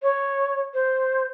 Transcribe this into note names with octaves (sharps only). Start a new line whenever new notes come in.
C#5
C5